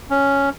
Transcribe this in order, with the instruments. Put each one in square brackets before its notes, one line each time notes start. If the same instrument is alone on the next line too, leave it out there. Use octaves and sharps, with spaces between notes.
[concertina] C#4